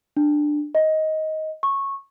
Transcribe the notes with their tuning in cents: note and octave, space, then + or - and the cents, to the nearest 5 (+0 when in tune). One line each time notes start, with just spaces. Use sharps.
D4 +15
D#5 +15
C#6 -15